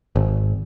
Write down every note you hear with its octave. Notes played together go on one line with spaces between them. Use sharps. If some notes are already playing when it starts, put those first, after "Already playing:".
G#1